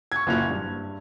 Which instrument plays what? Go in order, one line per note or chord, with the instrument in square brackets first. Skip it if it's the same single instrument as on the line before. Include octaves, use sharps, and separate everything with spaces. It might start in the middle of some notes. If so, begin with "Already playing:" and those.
[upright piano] C#6 G#6
F#1 A#2 E4 F#4 F7
G2